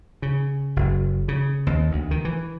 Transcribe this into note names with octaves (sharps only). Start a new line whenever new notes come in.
C#3
F#1
C#3
D#2
D2
D#3
E3